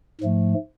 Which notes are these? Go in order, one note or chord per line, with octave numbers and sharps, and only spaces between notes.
G#2 F3 A3